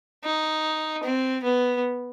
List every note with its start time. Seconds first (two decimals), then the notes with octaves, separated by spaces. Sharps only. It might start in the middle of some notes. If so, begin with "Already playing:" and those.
0.24 D#4
1.03 C4
1.43 B3